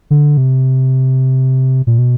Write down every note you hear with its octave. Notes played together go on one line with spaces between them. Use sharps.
D3
C3
A#2
B2